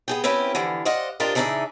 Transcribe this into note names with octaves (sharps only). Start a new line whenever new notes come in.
B3 G#4 G5
C4 C#4 E4 G4 B4
D3 E3 F3
C5 D5 D#5 F5 F#5
D4 F4 G4 A#4 C5 D#5
C#3 E3 D4 D#4 D5 E5